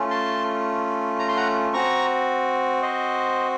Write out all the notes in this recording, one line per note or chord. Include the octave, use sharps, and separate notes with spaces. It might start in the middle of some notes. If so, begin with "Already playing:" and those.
Already playing: A3 C#4 F4
A5 C6
A#5
C6
F#5 A#5
C4 F#4 A#5 C#6
C5 D#5